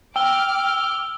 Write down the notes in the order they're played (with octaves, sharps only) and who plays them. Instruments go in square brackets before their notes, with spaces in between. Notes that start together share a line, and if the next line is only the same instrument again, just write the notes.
[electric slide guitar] G5 [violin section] D6 F6 [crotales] E6 G7